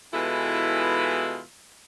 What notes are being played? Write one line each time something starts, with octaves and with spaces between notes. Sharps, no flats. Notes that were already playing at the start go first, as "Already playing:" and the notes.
B2 E3 G#3 E4 F4 A4